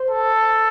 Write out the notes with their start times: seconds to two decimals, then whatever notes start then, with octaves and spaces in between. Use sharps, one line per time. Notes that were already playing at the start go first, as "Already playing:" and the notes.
Already playing: C5
0.10 A4